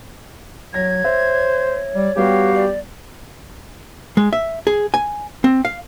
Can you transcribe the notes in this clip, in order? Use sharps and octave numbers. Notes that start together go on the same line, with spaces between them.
F#3 C#5 G#6 A#6
C5 E5
G3 D5
G3 B3 F#4 G4 F5
D5
G#3
E5
G#4
G#5
C4
F5